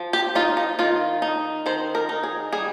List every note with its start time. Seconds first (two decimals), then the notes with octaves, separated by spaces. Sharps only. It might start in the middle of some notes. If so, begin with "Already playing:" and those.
Already playing: F3
0.13 G4
0.35 D#4 F4
0.57 D#4
0.79 D#3 F4
1.22 D#4
1.66 D#3 C5
1.95 A#4
2.09 D#4
2.24 G#4
2.53 G3 G#4